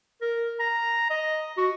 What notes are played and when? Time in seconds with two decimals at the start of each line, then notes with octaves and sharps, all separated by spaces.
0.21 A#4
0.59 A#5
1.10 D#5
1.57 F#4